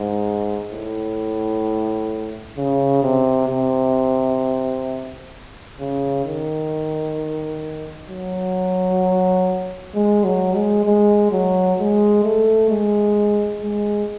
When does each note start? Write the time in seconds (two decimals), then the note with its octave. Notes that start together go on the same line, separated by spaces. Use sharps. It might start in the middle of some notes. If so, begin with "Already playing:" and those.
Already playing: G#2
0.72 A2
2.57 C#3
3.03 C3
3.49 C3
5.80 C#3
6.25 D#3
8.09 F#3
9.95 G#3
10.24 F#3
10.55 G#3
10.85 G#3
11.32 F#3
11.79 G#3
12.24 A3
12.70 G#3
13.62 G#3